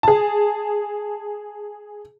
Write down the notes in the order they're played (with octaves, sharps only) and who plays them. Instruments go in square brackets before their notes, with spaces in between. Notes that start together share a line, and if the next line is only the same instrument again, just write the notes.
[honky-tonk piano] G#4 A5